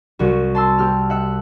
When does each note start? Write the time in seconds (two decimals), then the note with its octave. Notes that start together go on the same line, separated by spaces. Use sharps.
0.19 C2 F#4
0.55 A5 C6 E6
0.78 C4 G4 F6
1.10 E5 F#5